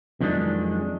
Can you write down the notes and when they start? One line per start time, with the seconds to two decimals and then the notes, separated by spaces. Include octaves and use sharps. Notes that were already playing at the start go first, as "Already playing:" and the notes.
0.21 F2 D#3 F#3 G#3 D4